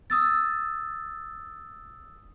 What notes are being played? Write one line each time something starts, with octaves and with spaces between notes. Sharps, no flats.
D#6 E6 A6